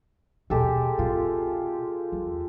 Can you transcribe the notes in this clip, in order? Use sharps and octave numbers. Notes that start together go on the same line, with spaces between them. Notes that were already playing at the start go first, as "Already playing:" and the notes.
D#2 B2 G#3 G4 A4
C3 F4
E2